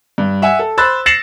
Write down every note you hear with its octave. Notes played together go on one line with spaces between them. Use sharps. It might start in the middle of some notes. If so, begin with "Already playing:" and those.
G2
E5 F#5 G#5
A4
C5 B5 E6 F#6 A6
A6 A#6 C7 C#7 E7 F#7